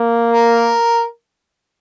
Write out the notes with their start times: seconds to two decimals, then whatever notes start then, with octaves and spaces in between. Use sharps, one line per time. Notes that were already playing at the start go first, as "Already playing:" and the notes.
Already playing: A#3
0.32 A#4